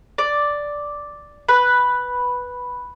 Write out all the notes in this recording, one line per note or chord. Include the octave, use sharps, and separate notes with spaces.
D5
B4